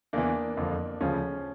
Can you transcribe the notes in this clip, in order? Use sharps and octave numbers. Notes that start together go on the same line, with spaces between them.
E2 E3 A#3 D4
F2 D3 F3
D2 C#3 F3 C#4